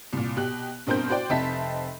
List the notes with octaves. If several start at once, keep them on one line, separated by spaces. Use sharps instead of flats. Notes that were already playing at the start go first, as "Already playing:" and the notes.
C2 A#2
B2 G4 F#6
G2 B2 C4 A#4 C5 G6
F#4 C5 D5 G5
F1 C4 D#4 E5 A5 B6